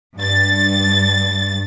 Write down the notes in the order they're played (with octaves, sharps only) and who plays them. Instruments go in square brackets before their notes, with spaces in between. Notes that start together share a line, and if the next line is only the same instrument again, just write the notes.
[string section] G2 A6